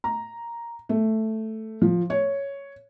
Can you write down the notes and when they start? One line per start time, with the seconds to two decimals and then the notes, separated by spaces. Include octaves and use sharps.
0.04 A#5
0.89 A3
1.82 F3
2.10 C#5